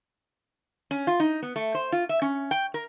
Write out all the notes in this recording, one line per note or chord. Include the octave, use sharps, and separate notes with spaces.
C#4
F4
D#4
B3
A3
C5
F4
E5
C#4
G5
A#4